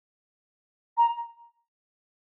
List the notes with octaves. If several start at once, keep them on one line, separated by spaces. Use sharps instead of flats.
A#5